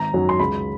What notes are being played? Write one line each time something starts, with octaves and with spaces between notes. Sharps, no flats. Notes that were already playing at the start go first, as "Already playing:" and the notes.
Already playing: G#1 A#5
F#2 D#3 F#3
C6
C#2 B5